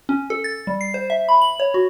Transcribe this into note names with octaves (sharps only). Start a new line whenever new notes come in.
C#4
A4
A6
G3
C7
C5
E5
B5
F#7
C#5
F#4